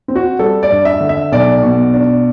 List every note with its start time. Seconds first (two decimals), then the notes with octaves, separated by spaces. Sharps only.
0.08 C4
0.16 F#4
0.39 G3 A4
0.63 D5
0.71 G2
0.85 E5
1.00 D3
1.09 E5
1.32 B1 D5
1.63 B2
1.94 D4